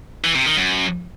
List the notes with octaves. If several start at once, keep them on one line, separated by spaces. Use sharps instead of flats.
E3
C3
D#3
F#2